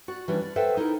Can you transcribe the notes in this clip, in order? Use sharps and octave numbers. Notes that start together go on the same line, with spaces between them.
F#4 D5
E3 G3 C#4 D4 C#5
D5
A4 B4 C5 E5 F#5 G5
D#4 E4 A#4